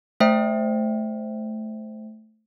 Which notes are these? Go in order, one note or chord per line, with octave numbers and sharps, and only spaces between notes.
A3 C5 E5 G5